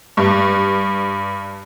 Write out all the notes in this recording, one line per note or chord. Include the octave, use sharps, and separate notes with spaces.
G2